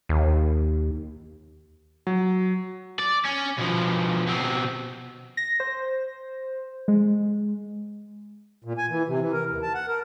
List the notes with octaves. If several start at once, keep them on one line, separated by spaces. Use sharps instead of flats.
D#2
F#3
D5
C#4
B2 F3
B2 C4
A#6
C5
G#3
A#2
G#5
E3
C3
E3
A#4
D#2
A5
F#5
A#4